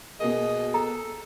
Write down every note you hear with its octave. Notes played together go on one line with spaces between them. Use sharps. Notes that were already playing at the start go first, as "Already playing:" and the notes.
B2 A#3 G#4 D#5
A4 A#5